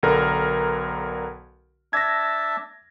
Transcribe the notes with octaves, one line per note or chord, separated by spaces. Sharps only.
B1 D3 A#4
D4 E5 A5 G#6 A#6